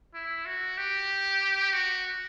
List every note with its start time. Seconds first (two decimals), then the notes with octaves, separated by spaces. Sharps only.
0.14 E4
0.46 F#4
0.77 G4
1.73 F#4